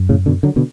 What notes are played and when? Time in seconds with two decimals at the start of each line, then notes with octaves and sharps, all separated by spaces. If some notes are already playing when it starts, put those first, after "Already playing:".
Already playing: F#2
0.09 A2 C#3
0.26 B2 D3
0.43 D3 F#3
0.56 B2 D3